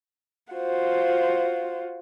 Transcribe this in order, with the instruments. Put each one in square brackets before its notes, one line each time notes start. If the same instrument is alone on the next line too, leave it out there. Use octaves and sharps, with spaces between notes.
[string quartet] F4 F#4 C5